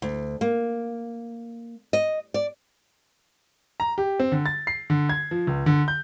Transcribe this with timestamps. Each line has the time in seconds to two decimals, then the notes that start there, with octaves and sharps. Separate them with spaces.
0.02 D2
0.41 A#3
1.93 D#5
2.34 D5
3.80 A#5
3.98 G4
4.20 C4
4.32 D3
4.46 A6
4.67 C7
4.90 D3
5.10 G#6
5.31 F3
5.47 C#2
5.66 D3
5.88 G6